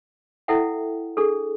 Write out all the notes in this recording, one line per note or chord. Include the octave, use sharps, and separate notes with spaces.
E4 A4 E5 F#5 G5
D4 G#4 A4